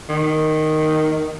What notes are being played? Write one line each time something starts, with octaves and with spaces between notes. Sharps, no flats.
D#3